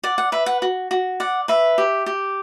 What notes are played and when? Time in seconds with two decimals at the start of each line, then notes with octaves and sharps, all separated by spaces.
0.04 D5 F#5
0.18 F#5
0.32 B4 E5
0.46 F#5
0.62 F#4
0.91 F#4
1.20 D5 F#5
1.48 B4 E5
1.78 G4
2.06 G4